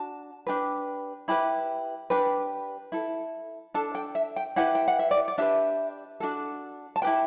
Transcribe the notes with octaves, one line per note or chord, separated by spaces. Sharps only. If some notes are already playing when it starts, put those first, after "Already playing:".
Already playing: D4 F#4 A5
D4 G4 B4
E4 G4 B4 B5
D4 G4 B4
E4 A4
D4 A4 A5
G5
E5
G5
E4 G4 B4 F#5
G5
F#5
E5
D5
D5
D4 G4 B4 E5
D4 F#4 A4
A5
E4 G4 B4 G5